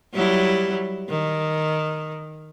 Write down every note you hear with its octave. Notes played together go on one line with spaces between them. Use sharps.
F#3 G3 E4
D#3